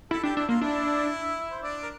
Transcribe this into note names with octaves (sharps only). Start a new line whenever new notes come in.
E4 A4 A5
D4 G4 G5
D4 E4 E5
A#3 F4 F5
D4 E4 E5
C5
D4 D5
A#4